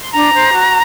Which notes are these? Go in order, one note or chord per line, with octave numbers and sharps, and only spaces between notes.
C6
D4 A#5
C5
F#4